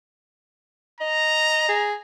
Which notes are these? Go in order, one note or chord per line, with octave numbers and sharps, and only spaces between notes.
D#5 A#5
G#4